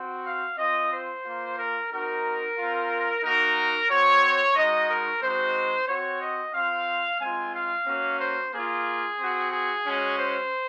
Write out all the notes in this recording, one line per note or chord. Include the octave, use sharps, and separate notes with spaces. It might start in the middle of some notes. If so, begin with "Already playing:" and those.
Already playing: C4 F#4
F5
C4 F4 D#5
C5
A#3 F4
A#4
C4 D#4 F#4 A#4
C4 F4
A#3 D#4 F#4 A#4
C4 F#4 C#5
G#3 D#4 F#4 D#5
A#4
G#3 C4 D#4 F#4 C5
C4 F#4 C#5
D#5
C4 F4 F5
G#3 C4 F4 G#5
F5
A#3 C#4 F#4
C5
A#3 F4 G#4
C4 F#4
G#4
G#3 C#4 F#4
C5